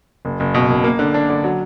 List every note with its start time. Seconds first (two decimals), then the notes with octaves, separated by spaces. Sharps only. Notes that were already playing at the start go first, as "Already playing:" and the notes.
0.25 F#1
0.40 F#1
0.54 B2
0.70 F#1
0.84 A#3
0.99 D3
1.14 D4
1.30 D3
1.44 F#3